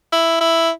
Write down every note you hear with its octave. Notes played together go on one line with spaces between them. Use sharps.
E4
E4